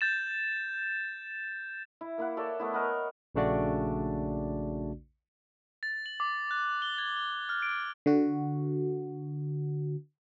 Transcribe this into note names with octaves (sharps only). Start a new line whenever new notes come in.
G6 A6 E7
E4
A#3 E4 F#5
A4 C#5 D5 E5
A3 B3 E4
A#4 D#5 F#5 B5
A#1 C#3 A3 D4 F#4 D5
A6
F#7
D6
F#6
G7
G#6
G7
F6
D7
D3 F#4